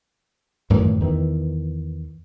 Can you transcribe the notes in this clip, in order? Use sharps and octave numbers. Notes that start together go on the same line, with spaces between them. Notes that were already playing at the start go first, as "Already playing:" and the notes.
F#2 A2 D#3 E3
E2 D#3 E3